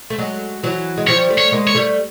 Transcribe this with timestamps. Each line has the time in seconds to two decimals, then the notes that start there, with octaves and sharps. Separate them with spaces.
0.10 A3
0.18 F#3 G#3
0.63 E3 F#3
0.97 G#3
1.07 F3 G3 C#5
1.30 G3 A3
1.38 C#5
1.52 G#3 A#3
1.67 C#5
1.74 G3 A3